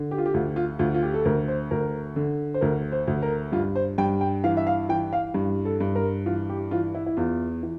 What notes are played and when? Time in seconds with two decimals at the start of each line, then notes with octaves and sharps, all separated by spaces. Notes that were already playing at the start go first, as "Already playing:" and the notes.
Already playing: D3
0.11 G4
0.18 F4
0.26 G4
0.34 D2 F4
0.56 F4
0.79 D2 F4
0.94 F4
1.03 G4
1.14 A4
1.25 D2 A#4
1.48 C5
1.71 D2 A#4
2.16 D3
2.54 C5
2.61 D2 A#4
2.92 C5
3.08 D2
3.22 A#4
3.52 G2 F4
3.75 C5
3.98 G2 G5
4.21 G5
4.44 E3 F5
4.57 E5
4.67 F5
4.89 E3 G5
5.13 F5
5.34 G2
5.65 A4
5.80 G2
5.95 A#4
6.26 E3 F4
6.49 G4
6.71 E3 F4
6.95 E4
7.06 E4
7.17 E2 F4
7.63 E3